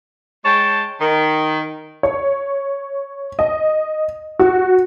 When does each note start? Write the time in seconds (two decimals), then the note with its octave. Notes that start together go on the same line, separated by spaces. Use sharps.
0.44 G#3 C#5 G5 A5
1.00 D#3
2.03 C#5
3.39 D#5
4.39 F#4